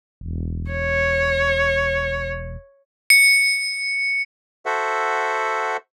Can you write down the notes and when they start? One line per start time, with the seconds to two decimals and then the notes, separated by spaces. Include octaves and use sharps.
0.21 E1
0.71 C#5
3.10 C#7
4.66 F#4 A4 C5 E5 F#5